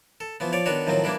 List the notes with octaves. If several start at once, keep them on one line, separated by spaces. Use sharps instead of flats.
A4
E3 F3 B3
F3 C#5 D5
D#3 B3 D4 F#4 C#5
A2 D#3 F3 F#3 C4
E3 G3 A#3 D4 E4